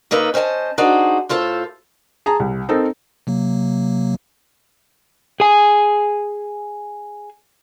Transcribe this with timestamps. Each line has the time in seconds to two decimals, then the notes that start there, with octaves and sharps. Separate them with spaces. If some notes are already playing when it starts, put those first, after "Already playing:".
0.11 C#3 A#3 D#4 A4 B4
0.34 C#4 C5 D#5 G5 A5
0.78 D4 D#4 F#4 G#4 C5
1.29 A2 F4 A4 C5 A5
2.26 G#4 A5 A#5
2.40 C2
2.69 C4 D#4 A4 A#4
3.27 C3 F#3 A#3
5.40 G#4 G#5